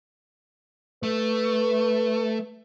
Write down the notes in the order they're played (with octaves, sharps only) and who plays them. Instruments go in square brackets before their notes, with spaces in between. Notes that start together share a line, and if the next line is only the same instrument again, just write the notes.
[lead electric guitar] A3 [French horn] B4